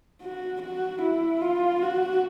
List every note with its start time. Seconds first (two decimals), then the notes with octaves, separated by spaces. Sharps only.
0.22 F#4
0.62 F#4
1.02 E4
1.42 F4
1.82 F#4